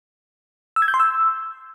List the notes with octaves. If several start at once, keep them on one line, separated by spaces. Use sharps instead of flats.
E6
G#6
G6
C6
E6